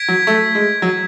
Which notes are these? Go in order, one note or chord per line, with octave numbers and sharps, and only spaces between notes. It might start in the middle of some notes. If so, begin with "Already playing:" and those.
Already playing: G#6 B6 D7
F#3
A3
G#3
F#3